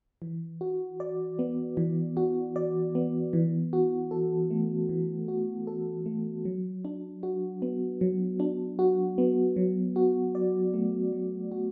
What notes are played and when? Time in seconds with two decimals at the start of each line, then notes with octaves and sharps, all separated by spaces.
0.22 E3
0.61 F#4
1.00 D5
1.39 B3
1.77 E3
2.17 F#4
2.56 D5
2.95 B3
3.33 E3
3.73 F#4
4.11 A4
4.51 A3
4.89 E3
5.28 F#4
5.67 A4
6.06 A3
6.45 F#3
6.85 D4
7.23 F#4
7.62 B3
8.01 F#3
8.40 D4
8.79 F#4
9.18 B3
9.56 F#3
9.96 F#4
10.35 D5
10.74 A3
11.13 F#3
11.52 F#4